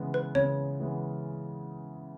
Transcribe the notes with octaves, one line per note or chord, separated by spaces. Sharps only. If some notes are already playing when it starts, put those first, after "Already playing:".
Already playing: C#3 E3 G#3 B3
B4
C#3 C#5
E3 G#3 B3